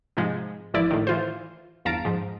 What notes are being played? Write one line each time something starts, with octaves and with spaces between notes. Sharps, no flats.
G#2 C3 F3 G#3
G#1 E2 F3 E4 D5
A2 D#3
E3 F4 C5
G1 E2 F5 A5 A#5 D7
G#2 F3